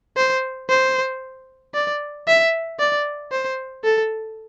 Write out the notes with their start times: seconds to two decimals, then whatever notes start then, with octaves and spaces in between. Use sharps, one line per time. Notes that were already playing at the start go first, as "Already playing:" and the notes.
0.17 C5
0.69 C5
1.74 D5
2.27 E5
2.79 D5
3.32 C5
3.84 A4